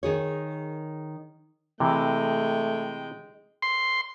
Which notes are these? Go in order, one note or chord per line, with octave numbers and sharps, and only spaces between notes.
D#3 G#4 C#5
C3 E3 G#3 A3 G5
C6